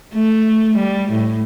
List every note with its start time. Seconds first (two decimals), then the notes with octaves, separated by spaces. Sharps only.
0.14 A3
0.77 G3
1.10 A2